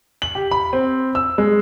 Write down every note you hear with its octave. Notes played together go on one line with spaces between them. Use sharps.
F#7
G4
B5
C4
E6
G#3